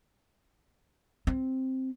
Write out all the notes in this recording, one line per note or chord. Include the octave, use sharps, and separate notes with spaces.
C4